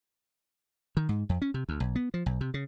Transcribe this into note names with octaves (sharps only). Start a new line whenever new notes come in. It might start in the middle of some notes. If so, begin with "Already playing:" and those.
D#3
G#2
F2
C#4
C3
D2
B1
B3
F3
B1
C3
C#3